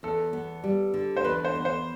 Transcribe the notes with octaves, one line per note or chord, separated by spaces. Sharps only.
E2 A4
B3
G3
D3
C5
E2 B4
C5
B3
C5